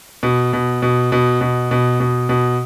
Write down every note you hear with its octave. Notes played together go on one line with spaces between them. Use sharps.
B2
B2
B2
B2
B2
B2
B2
B2